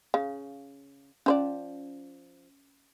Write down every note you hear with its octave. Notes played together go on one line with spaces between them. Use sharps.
C#3 F5
F3 C#4 C5 D5